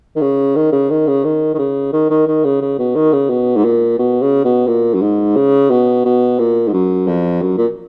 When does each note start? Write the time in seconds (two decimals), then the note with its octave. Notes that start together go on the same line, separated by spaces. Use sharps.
0.16 D#3
0.21 C#3
0.56 D#3
0.72 C#3
0.90 D#3
1.07 C#3
1.24 D#3
1.54 D#3
1.58 C#3
1.92 D#3
2.10 D#3
2.27 D#3
2.44 C#3
2.62 C#3
2.79 B2
2.95 D#3
3.13 C#3
3.30 B2
3.56 G#2
3.64 A#2
3.98 B2
4.22 C#3
4.44 B2
4.67 A#2
4.94 F#2
5.01 G#2
5.36 C#3
5.70 B2
6.05 B2
6.39 A#2
6.68 G#2
6.73 F#2
7.07 F2
7.42 F#2
7.57 A#2